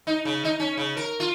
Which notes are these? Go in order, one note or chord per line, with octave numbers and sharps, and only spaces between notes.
D#4
C#3
D#4
C#4
C#3
A#4
F4